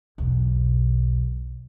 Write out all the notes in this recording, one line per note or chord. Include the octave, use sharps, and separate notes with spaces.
B1 E2